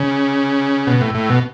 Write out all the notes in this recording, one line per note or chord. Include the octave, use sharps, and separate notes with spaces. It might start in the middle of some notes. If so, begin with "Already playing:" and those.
Already playing: C#3
B2
A2
A2
B2